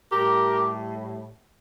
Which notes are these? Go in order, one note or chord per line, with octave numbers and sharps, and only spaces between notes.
A2 G3 G4 A#4